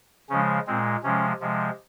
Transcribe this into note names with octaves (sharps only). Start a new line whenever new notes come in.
C#3 F3 G#3 C#4
A#2 G#3 C4
C3 F3 G#3 C#4
C3 F3 G#3